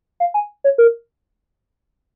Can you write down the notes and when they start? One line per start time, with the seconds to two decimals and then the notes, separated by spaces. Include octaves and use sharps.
0.20 F5
0.34 G#5
0.64 C#5
0.78 A#4